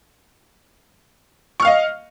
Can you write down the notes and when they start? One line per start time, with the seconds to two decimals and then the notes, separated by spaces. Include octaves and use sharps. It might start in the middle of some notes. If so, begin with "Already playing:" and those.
1.60 C#6
1.62 F6
1.65 F5
1.67 D#5